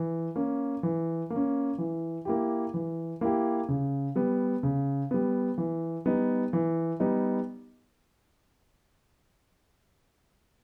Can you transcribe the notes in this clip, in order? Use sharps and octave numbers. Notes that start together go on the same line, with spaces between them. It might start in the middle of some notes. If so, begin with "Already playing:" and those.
Already playing: E3
A#3 C#4
E3
A#3
C#4
E3
A#3 E4 G4
E3
A#3 E4 G4
C#3
G3 B3
C#3
G3 B3
E3
G3 B3 D#4
E3
G3 B3 D#4